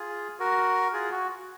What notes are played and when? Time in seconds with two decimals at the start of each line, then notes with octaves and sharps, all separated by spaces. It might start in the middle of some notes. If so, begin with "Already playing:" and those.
Already playing: F4 G#4
0.40 F#4 A#4
0.93 F4 G#4
1.11 F#4